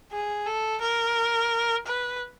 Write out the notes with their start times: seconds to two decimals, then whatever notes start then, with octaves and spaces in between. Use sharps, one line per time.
0.12 G#4
0.46 A4
0.81 A#4
1.87 B4